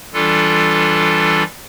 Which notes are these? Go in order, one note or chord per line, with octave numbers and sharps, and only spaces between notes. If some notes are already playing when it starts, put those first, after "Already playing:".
E3 G3 D4 F4 A4